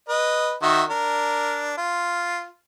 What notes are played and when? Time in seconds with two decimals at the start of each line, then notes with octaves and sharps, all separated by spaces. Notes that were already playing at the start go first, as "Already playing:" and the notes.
0.09 B4 D#5
0.62 D#3 F#4 E5
0.90 D4 A#4
1.77 F4